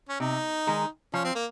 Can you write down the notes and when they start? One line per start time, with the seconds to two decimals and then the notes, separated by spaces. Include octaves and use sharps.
0.09 C#4
0.20 C3 D#4
0.67 D#3 G#3
1.14 F3 C#4
1.24 C4
1.35 A#3